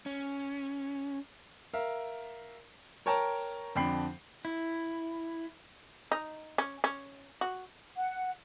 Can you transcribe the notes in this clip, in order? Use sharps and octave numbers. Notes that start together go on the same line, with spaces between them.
C#4
A#4 E5 F5
A#4 C#5 G5 A5 A#5
F2 D3 D4 G5 B5 C7
E4
D#4
C#4
C#4
F#4
F#5